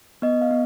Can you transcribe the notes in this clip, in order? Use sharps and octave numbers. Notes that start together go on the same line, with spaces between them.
B3 D#5
F5
B3